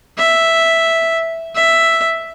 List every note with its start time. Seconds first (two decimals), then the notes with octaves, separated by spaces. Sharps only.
0.18 E5
1.55 E5